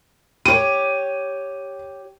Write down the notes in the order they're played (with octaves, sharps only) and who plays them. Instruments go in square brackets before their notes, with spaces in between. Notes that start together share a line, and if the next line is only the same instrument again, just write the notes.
[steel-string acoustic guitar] G4 C#5 [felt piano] D#7